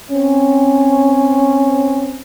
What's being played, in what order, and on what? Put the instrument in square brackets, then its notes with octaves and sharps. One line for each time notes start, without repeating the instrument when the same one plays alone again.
[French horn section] C4 C#4